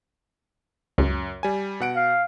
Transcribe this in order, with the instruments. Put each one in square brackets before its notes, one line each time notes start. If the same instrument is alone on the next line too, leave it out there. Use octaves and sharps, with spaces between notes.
[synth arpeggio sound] C#2 [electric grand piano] F#2
[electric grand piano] G3 G#5
B2 F#5 D7
[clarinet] F5